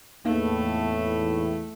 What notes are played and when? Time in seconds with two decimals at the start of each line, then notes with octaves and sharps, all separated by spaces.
0.25 E2 A2 A3 A#3 D#4 F5